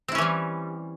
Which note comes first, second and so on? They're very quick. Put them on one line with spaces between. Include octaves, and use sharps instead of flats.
C4 E4 C#4 E3 G3